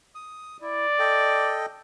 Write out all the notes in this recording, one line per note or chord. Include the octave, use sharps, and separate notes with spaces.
D#6
E4 D5
A4 D#5 G5